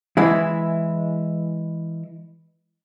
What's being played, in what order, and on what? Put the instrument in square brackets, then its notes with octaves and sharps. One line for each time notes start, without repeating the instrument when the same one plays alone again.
[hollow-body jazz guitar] E3 G#3 E4